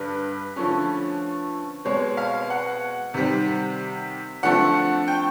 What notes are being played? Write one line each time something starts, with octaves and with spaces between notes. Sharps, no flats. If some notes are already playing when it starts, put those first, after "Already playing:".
Already playing: G2 D3 B4
D3 F3 A3 C#4
B2 G#3 C4 C#5
F5
F#5
C3 D#3 G3 C4
D3 F3 A3 C4 F#5
G5